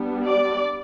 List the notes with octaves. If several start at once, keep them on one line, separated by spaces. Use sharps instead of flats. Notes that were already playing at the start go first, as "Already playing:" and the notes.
Already playing: G3 B3 D4
D5